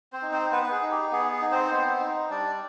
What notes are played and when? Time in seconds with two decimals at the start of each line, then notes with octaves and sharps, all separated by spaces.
0.13 C4 C5
0.22 D#4
0.32 C4 C5
0.52 B3 B4
0.63 B4
0.72 G#4
0.83 D#4
0.91 G4
1.12 B3 G#4
1.32 G#4
1.42 D#4
1.51 C4 C5
1.71 B3
2.00 D#4
2.30 G3 D4 D5